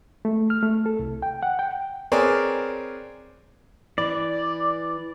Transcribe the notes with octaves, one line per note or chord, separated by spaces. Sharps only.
A3
F6
A3
A4
C2
G5
F#5
G5
C4 G#4 A#4 B4 C#5 D5
E3 D5